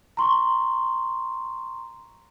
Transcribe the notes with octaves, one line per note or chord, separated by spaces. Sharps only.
A#5 C6 C#6